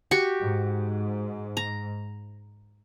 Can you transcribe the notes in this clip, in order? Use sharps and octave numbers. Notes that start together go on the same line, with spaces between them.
F#4 G4 C#6
G#2
A#5